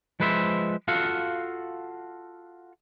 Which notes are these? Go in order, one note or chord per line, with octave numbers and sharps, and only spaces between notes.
F3 G#3 B4 C5 E5
F4 F#4 A4 F5 F#5